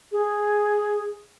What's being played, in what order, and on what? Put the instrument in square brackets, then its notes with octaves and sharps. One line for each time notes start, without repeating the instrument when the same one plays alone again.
[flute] G#4